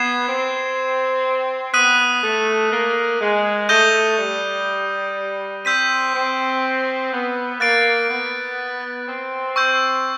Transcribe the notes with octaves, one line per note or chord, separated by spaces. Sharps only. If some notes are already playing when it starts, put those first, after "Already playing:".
Already playing: B3 G#6 C7 E7
C4
B3 D#6 F#6 B6 D#7 F#7
A3
A#3
G#3
A3 D#6 G6 A#6 D#7 G7
G3
C4 E6 G6 B6 D#7
C4
B3
A#3 F#6 A6 D7
B3
C4
C#6 E6 G6